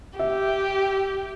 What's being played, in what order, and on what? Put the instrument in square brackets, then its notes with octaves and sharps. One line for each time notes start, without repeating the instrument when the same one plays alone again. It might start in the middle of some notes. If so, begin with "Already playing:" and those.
[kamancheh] G4 [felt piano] E5